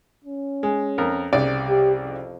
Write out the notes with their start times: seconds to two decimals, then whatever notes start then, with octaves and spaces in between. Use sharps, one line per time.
0.24 C#4
0.63 G#3
0.98 F2 A#4
1.33 C2 C#3 D5
1.68 G4
2.04 F2